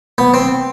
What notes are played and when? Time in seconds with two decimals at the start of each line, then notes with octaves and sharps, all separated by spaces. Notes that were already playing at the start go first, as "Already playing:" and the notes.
0.18 B3
0.34 C4